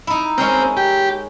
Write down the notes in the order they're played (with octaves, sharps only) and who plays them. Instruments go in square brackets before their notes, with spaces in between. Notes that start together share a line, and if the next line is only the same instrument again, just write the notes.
[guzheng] D#4 E4
[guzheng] G#3 C#4 A#4 [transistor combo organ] C4
[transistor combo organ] G4